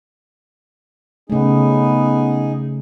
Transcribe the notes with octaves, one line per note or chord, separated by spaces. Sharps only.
C#3 A3 B3 D#4 G#4